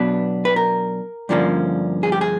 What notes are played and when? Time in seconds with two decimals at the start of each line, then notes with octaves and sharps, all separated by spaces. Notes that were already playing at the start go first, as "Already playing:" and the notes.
Already playing: B2 F#3 B3 D4 B4
0.45 B4
0.56 A#4
1.29 G2 D3 F3 A#3 C#4
2.03 G#4
2.12 G4
2.21 G#4